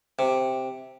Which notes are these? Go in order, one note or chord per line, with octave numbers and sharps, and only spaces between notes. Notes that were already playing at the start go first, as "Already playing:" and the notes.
C3